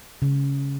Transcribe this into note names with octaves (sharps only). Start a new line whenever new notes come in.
C#3